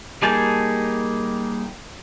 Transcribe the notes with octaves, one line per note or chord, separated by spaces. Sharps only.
G3 A#3 D#4 G#4 A5